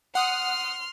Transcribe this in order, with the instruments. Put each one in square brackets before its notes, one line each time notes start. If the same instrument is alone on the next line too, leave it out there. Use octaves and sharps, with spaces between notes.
[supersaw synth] F#5 D#6 [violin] C6 F6